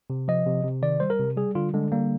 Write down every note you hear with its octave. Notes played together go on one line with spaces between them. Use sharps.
C3
F3 D#5
C3
C3
D#3 D5
G3 C5
A#4
C3
G3 G#4
D3 F4
D3 G#3
G3 A#3